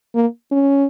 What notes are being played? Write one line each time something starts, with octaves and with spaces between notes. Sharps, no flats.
A#3
C#4